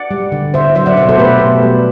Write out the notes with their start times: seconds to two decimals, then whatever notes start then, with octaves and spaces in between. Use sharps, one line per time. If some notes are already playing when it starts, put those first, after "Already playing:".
Already playing: D5 F#5
0.11 G3
0.32 D3
0.54 D3 C5 E5
0.75 F#3 C5 E5
0.86 D5 F#5
0.97 B2 C5 E5
1.09 A4 C5
1.18 A3 G4 B4
1.40 B2
1.62 G3